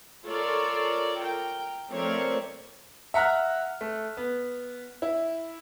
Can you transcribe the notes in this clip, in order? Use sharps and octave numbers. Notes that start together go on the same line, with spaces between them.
F4 A4 A#4 C#5 D5
A#4 G5
F3 A3 C4 A#4 C#5 D5
E5 F#5 A#5 F6 F#6
A3
B3
E4